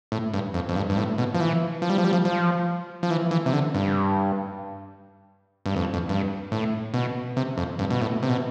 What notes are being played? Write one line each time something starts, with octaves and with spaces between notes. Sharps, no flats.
A2
G2
F2
F2
G2
G2
A2
B2
F3
E3
F3
G3
F3
G3
F3
F3
F3
E3
E3
C3
D3
G2
G2
F2
F2
G2
A2
B2
C3
F2
G2
B2
A2
C3
B2